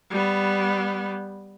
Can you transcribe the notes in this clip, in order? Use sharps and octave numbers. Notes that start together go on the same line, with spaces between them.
G3 B3